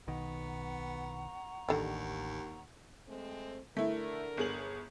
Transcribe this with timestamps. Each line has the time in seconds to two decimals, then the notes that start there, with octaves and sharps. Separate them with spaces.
0.08 B1 D#3 B3 F#5 A#5 C#6
1.69 A1 D#2 D3 D#3 G3
3.09 G#3 A3 C4
3.77 D3 A3 E4 A#4
4.37 G1 G#4 F#7